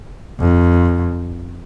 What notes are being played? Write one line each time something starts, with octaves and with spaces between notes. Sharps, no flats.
F2